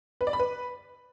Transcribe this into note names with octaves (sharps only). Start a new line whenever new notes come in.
B4
D5
B5
B4